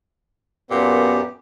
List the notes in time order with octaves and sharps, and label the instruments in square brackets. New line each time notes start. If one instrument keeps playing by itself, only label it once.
[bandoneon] F#2 G4 [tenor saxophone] A#2 [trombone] B3